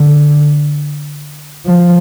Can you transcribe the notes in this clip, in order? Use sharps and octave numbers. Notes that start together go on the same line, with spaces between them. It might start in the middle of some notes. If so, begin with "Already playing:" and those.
Already playing: D3
F3